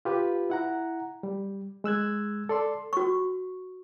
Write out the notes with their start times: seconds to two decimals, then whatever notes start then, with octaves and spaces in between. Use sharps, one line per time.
0.05 F4 G4 B4
0.50 E4 F#5 A#5
1.23 G3
1.84 G#3 E6 F#6 G#6
2.49 A4 D5 C6
2.93 F#4 C#6